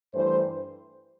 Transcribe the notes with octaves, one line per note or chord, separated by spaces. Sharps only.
G2 E3 A3 C5